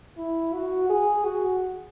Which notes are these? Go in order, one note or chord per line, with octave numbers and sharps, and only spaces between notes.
E4
F#4
G#4
F#4